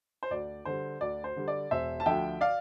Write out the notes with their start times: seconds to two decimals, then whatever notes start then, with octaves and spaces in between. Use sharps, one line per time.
0.23 C5
0.31 D2 D5
0.65 D3 G3 C5
1.01 D2 D5
1.24 C5
1.36 D3 G3
1.48 D5
1.71 E1 C5 E5
2.00 A5
2.06 D2 D3 F3 E5 G5
2.41 D5 F5